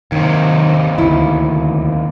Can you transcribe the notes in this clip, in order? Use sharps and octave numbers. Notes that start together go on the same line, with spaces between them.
D#2 C3 D#3
D2 E4